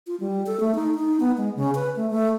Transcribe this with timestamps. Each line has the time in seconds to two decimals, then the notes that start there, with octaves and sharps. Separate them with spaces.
0.07 F4
0.20 G3
0.46 A4
0.60 A3
0.75 D#4
0.95 D#4
1.20 B3
1.37 G#3
1.56 C#3
1.75 B4
1.96 A3
2.10 A3